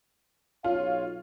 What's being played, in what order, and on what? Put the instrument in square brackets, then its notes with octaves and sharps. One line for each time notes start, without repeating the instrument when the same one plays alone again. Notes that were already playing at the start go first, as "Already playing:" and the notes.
[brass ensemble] B1 C#5 F5 [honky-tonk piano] F4